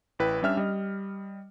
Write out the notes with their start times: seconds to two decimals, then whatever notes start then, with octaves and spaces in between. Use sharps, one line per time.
0.19 A1 E4 B4 G5
0.42 G3 C#4 D4 E5 G5 F6
0.57 G3 D#5